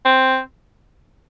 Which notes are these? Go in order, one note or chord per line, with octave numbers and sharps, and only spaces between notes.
C4